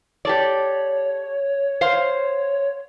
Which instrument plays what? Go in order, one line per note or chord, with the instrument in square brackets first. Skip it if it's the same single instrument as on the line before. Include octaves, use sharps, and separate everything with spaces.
[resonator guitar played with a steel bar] G4 A4 D5 [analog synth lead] C#5
[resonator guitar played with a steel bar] C5 F5